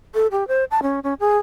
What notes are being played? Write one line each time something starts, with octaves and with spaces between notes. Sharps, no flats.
A4
G4
C5
A5
C#4
C#4
G#4